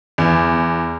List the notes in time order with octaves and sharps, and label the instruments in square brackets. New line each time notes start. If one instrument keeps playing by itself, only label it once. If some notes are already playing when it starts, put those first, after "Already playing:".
[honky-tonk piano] E2